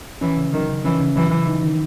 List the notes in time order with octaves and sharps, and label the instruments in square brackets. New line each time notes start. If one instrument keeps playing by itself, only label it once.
[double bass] E3 [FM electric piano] C#4
[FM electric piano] C#3
[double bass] D#3 [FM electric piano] F#3
[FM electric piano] C#3
[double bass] E3 [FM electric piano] C#4
[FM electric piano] C#3
[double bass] E3 [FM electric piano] F#3
[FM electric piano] C#3
D#4
D#3